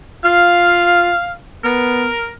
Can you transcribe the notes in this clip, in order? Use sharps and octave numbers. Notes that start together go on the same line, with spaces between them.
F4 F5
B3 A#4